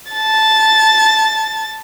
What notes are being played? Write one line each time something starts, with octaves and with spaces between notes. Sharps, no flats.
A5 A6